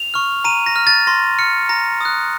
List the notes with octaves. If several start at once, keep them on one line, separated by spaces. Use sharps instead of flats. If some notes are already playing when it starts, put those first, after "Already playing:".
Already playing: F7
C#6 F6
A#5 D#7
A#6
F6
A6
C6 A#6
F6 C#7
A#5 A#6
D#6 F#6